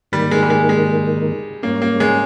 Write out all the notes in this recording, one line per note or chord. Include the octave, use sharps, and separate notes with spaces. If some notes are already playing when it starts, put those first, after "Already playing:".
G#2 D#3 G3 A#3
G#3
G3
G#3
G#3
G#2 G3 A#3 C#4
A#3
G#3